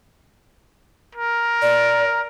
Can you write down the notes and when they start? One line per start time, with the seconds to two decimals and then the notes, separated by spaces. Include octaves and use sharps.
1.15 A#4
1.62 D5